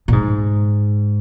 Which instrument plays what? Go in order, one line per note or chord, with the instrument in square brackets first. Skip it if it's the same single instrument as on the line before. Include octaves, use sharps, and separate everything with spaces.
[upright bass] A#2
G#2